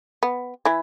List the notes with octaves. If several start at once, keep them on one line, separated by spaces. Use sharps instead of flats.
B3
E3 E4